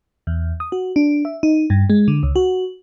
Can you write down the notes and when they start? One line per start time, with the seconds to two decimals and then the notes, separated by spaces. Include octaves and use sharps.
0.27 E2
0.60 D#6
0.72 F#4
0.96 D4
1.25 E5
1.43 D#4
1.70 G2
1.90 G#3
2.08 D3
2.23 C#2
2.36 F#4